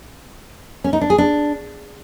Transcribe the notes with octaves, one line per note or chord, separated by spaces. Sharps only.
C#4
D#4
D4
G#4
D4